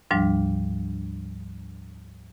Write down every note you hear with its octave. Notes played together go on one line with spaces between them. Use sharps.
D2 G#2 F3 G3 D4